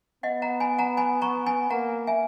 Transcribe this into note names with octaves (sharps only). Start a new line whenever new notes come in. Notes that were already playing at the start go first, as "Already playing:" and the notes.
B3 D#5 F#5
F#5 A#5
G#5 B5
F#5 A#5
G#5 B5
A#5 C#6
G#5 B5
A#3 F#5 A#5
E5 G#5